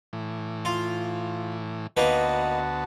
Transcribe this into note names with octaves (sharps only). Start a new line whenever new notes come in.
A2 E3
F4
D2 A#3 B3 D#4 F#4 B4 F#5 A5